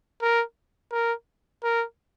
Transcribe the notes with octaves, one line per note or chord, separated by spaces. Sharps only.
A#4
A#4
A#4